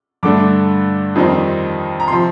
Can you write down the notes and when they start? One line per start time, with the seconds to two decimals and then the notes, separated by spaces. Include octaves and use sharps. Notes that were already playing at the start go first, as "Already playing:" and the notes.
0.23 G2 D3 A3 D4 D6
1.15 F2 D#3 G3 C4 D#4
2.00 A#5
2.08 C3 F3 C6